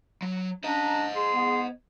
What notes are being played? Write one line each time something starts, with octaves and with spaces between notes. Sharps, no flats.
F#3
C#4 D4 C5 D#5 A#5
G#4 C6
B3